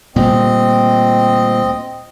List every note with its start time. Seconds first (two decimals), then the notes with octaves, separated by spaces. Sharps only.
0.16 D2 A#2 G3 C4 D#5